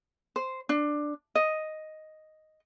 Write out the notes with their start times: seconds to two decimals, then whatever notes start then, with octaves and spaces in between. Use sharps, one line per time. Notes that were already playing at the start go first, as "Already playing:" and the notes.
0.36 C5
0.69 D4
1.35 D#5